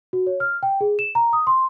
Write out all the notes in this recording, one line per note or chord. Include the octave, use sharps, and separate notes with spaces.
F#4
C#5
F6
G5
G#4
E7
A#5
D#6
C6